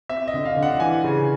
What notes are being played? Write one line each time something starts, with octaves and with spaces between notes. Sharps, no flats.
C4 E5
D#5
D3
F5
D3
F#5
E3 G#5
C#3